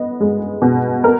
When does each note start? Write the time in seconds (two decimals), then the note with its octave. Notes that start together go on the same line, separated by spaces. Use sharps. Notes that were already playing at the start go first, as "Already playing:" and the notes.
Already playing: B3 D#5
0.20 G#3
0.62 B2
1.04 B3 A#4